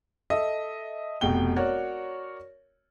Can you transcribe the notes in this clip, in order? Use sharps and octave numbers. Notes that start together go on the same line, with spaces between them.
A4 D#5 E5
F1 B2 G5 G7
F#4 A#4 C#5 D5